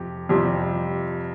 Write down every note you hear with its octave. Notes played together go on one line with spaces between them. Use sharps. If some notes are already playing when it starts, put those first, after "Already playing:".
Already playing: F2 C3 G4
F2 C3 G3